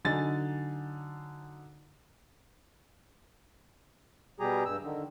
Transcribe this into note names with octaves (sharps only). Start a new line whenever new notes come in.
D3 F#3 D#4 G#5 A6
B2 G3 G4 G#4 A#5
G2 E6
D3 D#3